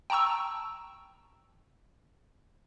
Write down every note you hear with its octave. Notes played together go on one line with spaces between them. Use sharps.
G5 A5 A#5 C#6 E6